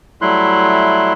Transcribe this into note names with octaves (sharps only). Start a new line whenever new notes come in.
F#3 G3 A3 E4 C6 F#6